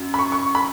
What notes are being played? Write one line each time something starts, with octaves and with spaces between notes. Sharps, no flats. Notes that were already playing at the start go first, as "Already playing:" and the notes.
Already playing: F#2
B5
C#6
C#6
B5